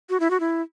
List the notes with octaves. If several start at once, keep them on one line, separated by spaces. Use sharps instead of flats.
F#4
E4
F#4
E4